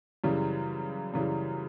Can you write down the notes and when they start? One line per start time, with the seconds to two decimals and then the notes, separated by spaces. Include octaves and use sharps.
0.24 F#2 C#3 E3 G3
1.14 F#2 C#3 E3 G3